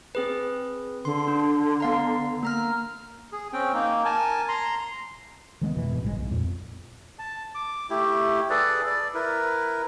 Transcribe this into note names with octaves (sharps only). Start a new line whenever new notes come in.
C4 G#4 B4
D3 C6
D4
B3 F5 A#5
A#3 A#5 F6
G#4
C4 C#4 G5
A#3 D#4
A#4 G#5 A5
A#5 C6
D#3 G#3 A3 B3
F1 B2 E3
G#2 B2
G1 A2 C#3 G#3
B1
F2 A#2
A5
D6
A3 E4 G4
G#4 A4 B4 D5
D5
E4 A#4 B4